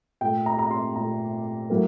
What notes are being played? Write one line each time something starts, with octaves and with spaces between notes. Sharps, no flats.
A#2 A3 G5
A#5
A#5
C6
A#2 A3 A#5
A2 F#3 A#3